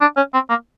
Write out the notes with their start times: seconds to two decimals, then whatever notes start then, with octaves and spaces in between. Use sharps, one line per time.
0.01 D4
0.17 C#4
0.34 C4
0.50 A#3